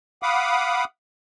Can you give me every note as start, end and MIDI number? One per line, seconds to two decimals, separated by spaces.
0.23 0.84 77
0.23 0.84 78
0.23 0.84 83
0.23 0.84 86
0.23 0.84 87